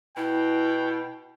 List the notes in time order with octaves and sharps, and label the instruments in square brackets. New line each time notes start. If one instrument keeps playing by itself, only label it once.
[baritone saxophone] B2 [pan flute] E4 [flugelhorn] G5